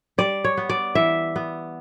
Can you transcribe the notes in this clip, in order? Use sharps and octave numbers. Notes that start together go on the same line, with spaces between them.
G3 D5
C#5
B3
D5
E3 E5
B3